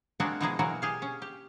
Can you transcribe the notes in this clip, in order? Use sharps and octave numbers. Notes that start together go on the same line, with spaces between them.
G#3 A#3 C4 D4 F#4 A#4
B2 E3 F3 G#3 A#3 G#4
B2 E3 F#3 A#3 F#4 A#4
G4 G#4 F5
C#4
G4